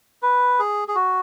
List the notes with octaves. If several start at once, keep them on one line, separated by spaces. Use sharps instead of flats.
B4
G#4
G#4
F#4